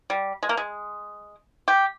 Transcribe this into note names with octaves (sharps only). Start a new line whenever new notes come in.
G3
G#3
A#3
G#3
G4